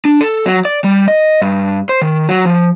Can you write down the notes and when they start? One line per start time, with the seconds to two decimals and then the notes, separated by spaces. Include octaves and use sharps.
0.05 D4
0.21 A4
0.46 F#3
0.65 D5
0.84 G3
1.08 D#5
1.42 G2
1.89 C5
2.01 D#3
2.29 F#3
2.46 F3